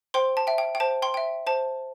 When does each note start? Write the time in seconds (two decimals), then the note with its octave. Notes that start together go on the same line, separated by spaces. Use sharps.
0.14 C5 G5 C6
0.37 A5
0.47 E5 G5
0.58 G5
0.75 G5
0.80 C5 A5
1.02 G5 C6
1.14 E5 G5
1.47 C5 A5